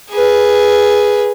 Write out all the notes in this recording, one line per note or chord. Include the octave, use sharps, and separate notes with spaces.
G#4 B4